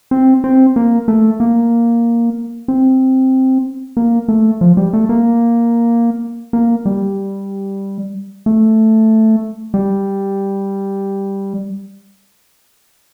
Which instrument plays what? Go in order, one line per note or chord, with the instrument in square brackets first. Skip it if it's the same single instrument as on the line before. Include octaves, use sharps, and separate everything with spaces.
[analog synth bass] C4
C4
A#3
A3
A#3
C4
A#3
A3
F3
G3
A3
A#3
A#3
G3
A3
G3